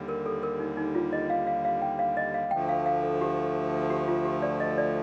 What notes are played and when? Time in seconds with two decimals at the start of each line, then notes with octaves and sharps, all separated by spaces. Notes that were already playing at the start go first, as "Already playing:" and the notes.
Already playing: D#2 D3 G3
0.09 A#4
0.26 A4
0.43 A#4
0.60 D#4
0.77 D#4
0.95 F4
1.13 D#5
1.30 F5
1.47 F5
1.65 F5
1.82 G5
1.99 F5
2.17 D#5
2.34 F5
2.51 D2 D3 F3 A3 G5
2.69 F5
2.86 F5
3.04 A4
3.21 G4
3.90 G4
4.08 F4
4.25 G4
4.42 D5
4.60 D#5
4.78 D5